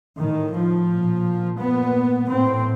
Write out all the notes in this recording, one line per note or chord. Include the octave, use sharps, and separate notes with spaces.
A2 D#3
F3
A#2
A#2 B3
A2 C4